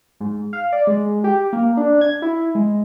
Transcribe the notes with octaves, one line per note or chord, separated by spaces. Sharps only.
G#2
F5
D5
G#3
G4
A#3
D4
G#6
E4
G#3